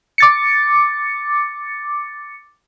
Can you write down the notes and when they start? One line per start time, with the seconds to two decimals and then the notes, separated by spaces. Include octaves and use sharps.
0.18 D6 A6 C#7